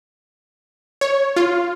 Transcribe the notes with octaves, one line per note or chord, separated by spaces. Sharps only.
C#5
F4